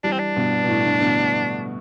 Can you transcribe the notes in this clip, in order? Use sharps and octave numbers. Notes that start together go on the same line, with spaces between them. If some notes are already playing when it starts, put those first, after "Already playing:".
E3 G3 D4
C4
D4
G2 B2
B2
A2
G2 B2
B2 D3